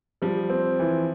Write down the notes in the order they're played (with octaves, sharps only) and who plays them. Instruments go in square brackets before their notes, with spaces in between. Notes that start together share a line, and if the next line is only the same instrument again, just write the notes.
[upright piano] F3 [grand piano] G3
[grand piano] C4
E3